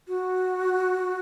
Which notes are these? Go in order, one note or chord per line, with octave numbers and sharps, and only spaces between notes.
F#4